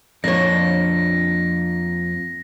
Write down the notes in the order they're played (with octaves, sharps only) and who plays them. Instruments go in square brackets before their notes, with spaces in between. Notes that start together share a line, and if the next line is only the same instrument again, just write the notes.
[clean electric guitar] F2 A#3 [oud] D4 C#5 [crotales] A#6